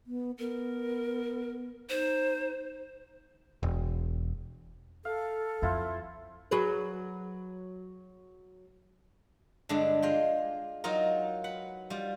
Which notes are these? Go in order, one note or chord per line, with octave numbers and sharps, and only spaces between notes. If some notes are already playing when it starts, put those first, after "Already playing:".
B3
B3 A#4
D#4 C5
E1
A4 F5
F2 C4 E4 F4
F#3 G#4 B4
G2 D3 G#3 D4
G#3 F4 G5
F#3 D#4 F4 A#4
B4 F#5
G3 F4